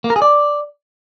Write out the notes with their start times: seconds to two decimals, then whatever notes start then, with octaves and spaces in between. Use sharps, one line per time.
0.04 A#3
0.10 A#4
0.16 G#4
0.22 D5